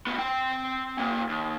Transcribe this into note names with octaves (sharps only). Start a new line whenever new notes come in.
A2 B3
C4 G5
C#3 A#3
D#2